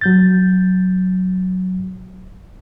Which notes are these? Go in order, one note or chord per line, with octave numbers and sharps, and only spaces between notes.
F#3 G6 A6